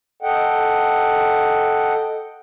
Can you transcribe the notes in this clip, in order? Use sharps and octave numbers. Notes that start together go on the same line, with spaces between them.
A4 D#5 F#5 G5